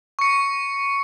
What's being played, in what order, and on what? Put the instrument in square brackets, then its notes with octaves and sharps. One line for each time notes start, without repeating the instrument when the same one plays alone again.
[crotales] C#6 C#7